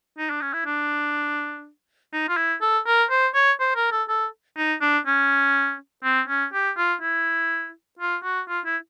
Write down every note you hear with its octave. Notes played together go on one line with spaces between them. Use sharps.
D#4
D4
C#4
E4
D4
D#4
F4
E4
A4
A#4
C5
C#5
C5
A#4
A4
A4
D#4
D4
C#4
C4
C#4
G4
F4
E4
F4
F#4
F4
E4